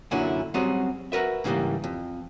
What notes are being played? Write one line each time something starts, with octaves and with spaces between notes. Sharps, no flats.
F#2 A#2 D3 C#4 E4
F#3 G3 C4 C#4 F#4 G#4
F#4 A#4 B4 E5
G#2 C#3 E3 F#3 G3 A#3
F2